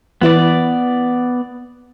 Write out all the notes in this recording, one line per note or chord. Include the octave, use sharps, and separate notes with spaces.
E3 B3 E4 B4 D5